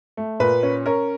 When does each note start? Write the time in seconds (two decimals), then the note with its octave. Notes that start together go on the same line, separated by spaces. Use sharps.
0.17 A3
0.40 A#2 B4
0.63 C#4
0.86 C#4 A#4